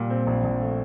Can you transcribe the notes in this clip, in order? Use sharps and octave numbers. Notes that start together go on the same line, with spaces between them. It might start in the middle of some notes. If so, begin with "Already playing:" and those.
Already playing: A#2 G3
C4
A#1
A#1
A3